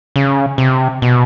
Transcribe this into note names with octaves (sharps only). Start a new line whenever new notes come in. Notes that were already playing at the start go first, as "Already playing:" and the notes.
C#3
C3
B2